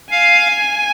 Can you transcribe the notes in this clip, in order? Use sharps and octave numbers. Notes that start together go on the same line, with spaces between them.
F5 G#5